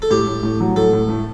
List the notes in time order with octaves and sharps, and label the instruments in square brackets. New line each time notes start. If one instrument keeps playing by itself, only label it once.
[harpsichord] A4
[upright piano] A2 [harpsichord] G4
[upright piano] A2
A2
F#3
[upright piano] A2 [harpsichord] A4
[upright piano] A2
A3